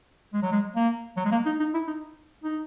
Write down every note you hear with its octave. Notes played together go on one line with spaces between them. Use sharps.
G#3
F#3
G#3
A#3
F#3
G#3
A#3
D#4
D#4
E4
D#4
D#4